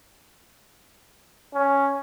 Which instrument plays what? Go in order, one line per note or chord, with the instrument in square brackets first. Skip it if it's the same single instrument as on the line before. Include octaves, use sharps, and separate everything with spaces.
[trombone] C#4